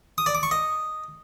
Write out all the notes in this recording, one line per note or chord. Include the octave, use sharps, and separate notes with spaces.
D#6
D5
D6
C#6
D#5